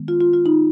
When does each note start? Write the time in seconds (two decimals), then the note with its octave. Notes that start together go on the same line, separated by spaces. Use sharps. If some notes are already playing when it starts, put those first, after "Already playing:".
Already playing: D#3 G#3 B3
0.08 F4
0.20 F4
0.34 F4
0.46 D#4